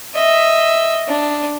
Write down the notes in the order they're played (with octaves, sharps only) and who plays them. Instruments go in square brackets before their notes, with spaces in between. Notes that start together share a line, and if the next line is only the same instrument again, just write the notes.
[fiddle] D#5 E5
D4